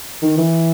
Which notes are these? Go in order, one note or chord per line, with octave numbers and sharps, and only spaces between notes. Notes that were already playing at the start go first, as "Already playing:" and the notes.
D#3
E3